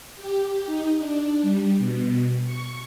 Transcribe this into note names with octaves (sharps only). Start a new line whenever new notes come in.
G4
D#4
D4
G3
B2
C#6